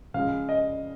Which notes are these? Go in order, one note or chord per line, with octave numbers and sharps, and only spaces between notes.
C#3 F3 G#3 F5
D#5